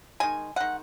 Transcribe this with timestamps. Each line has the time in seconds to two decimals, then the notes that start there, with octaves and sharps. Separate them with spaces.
0.20 D#3 G#3 G#5
0.56 D#3 G#3 F#5